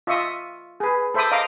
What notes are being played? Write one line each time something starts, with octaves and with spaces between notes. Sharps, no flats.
F4 D#5 E5 C#6 D#6
G#4 B4
A4 C5 E5 B5 D6 D#6
D#5 F5 A#5 D6